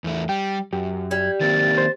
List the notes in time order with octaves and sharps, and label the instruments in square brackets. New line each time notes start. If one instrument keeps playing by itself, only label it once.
[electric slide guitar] E2 A3 E4
[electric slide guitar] G3 [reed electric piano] G5
[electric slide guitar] F#2 [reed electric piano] G4
[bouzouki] G3 [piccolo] G#6
[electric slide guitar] D#3 A#3 C4 [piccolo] A6
[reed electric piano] C5